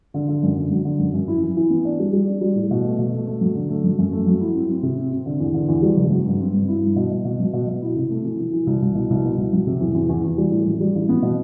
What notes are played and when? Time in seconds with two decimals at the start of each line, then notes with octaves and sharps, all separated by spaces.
0.14 D3
0.28 D3
0.43 F#2
0.57 D3
0.71 F#3
0.85 D3
0.99 F#2
1.14 F#2
1.28 E4
1.43 E3
1.57 E3
1.70 B3
1.85 D4
1.99 G3
2.13 G3
2.27 D4
2.41 G3
2.56 A2
2.71 B2
2.85 A3
2.99 B2
3.13 A3
3.27 A3
3.41 F#3
3.55 D3
3.69 A3
3.84 F#3
3.98 F#2
4.12 A3
4.27 F#3
4.41 E4
4.55 C4
4.69 C4
4.83 C3
4.97 C4
5.12 C4
5.26 D3
5.40 E2
5.54 D3
5.68 E2
5.82 G3
5.97 F#1
6.11 F#3
6.26 G2
6.39 C4
6.53 G2
6.68 E4
6.83 G2
6.96 B2
7.11 B2
7.25 B2
7.40 F#3
7.53 B2
7.68 B2
7.82 E4
7.96 C3
8.10 A3
8.25 E3
8.39 E3
8.53 E3
8.67 C2
8.82 C2
8.95 B2
9.10 C2
9.24 B2
9.38 C2
9.53 F#3
9.67 C3
9.81 E2
9.94 E2
10.09 E2
10.24 E2
10.38 G3
10.52 A2
10.67 A1
10.80 G3
10.95 A1
11.09 B3
11.22 B2